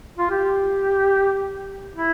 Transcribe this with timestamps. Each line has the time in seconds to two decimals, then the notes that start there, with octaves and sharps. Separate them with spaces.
0.18 F4
0.30 G4
1.96 E4